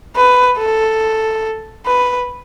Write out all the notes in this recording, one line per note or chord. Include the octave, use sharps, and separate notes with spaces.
B4
A4
B4